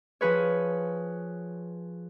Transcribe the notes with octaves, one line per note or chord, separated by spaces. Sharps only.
F3 G#4 B4 C#5